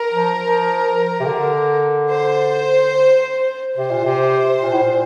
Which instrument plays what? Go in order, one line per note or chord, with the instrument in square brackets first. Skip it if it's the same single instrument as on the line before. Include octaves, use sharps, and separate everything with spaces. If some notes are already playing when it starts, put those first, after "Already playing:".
Already playing: [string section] A#4
[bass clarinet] F3
F3
C3
D3
[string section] C5
[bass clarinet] C3 [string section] C5
[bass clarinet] A#2
C3
A#2
A2
A#2